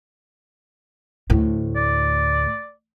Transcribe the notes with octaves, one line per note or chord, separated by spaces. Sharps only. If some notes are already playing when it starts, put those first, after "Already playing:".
D2 A2
D5